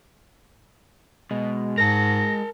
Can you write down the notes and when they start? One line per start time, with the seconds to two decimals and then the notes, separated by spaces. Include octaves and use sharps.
1.31 B2 G#3
1.78 G#2 A#4 A5 A#6